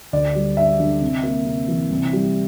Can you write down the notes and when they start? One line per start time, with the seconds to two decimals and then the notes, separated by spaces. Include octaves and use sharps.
0.13 D2 D5
0.35 G3
0.57 D4 E5
0.80 D3
1.01 C3
1.23 A#3
1.46 C3
1.68 E3
1.90 C2
2.13 G3